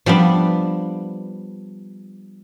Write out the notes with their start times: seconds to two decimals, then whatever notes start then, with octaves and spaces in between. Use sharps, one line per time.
0.06 F3 G3 B3 D4